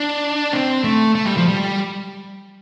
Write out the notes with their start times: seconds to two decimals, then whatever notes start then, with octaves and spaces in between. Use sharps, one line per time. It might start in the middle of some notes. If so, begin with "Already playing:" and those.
Already playing: D4
0.53 C4
0.84 A3
1.15 A3
1.25 G3
1.37 F3
1.48 G3